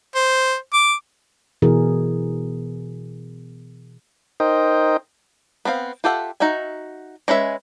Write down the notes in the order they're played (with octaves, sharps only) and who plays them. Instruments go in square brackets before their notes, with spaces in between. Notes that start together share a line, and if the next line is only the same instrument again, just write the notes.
[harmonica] C5
D6
[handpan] B2 E3 G#4 A#4
[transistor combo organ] D#4 A#4 C5 D#5 G5
[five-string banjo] B3 C4 B4 F5
F4 G4 A4 E5 F#5
D#4 F#4 E5 G#5
G#3 C#4 B4 E5